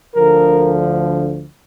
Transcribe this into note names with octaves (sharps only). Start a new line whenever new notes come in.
D2 D3 F3 A#4